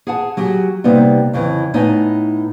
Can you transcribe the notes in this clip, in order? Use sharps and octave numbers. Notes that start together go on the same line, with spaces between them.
G#4 F#5 A5
F#3 G4 G#4
C3 G3 A#3 B3 D#4
F2 C#3 E3
A2 B3 D#4 C#5 G#5